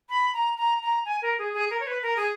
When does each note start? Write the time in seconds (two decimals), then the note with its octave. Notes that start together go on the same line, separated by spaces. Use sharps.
0.09 B5
0.33 A#5
0.57 A#5
0.82 A#5
1.05 G#5
1.22 A#4
1.39 G#4
1.54 G#4
1.71 A#4
1.80 C#5
1.87 B4
2.03 A#4
2.17 G#4